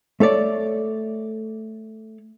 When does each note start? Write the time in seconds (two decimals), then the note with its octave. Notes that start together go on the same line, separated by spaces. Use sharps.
0.20 A3 A4 C#5 D5